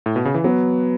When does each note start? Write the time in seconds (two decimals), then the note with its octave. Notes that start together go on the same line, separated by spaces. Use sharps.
0.06 A2
0.16 B2
0.25 C#3
0.34 E3
0.44 F#3 B3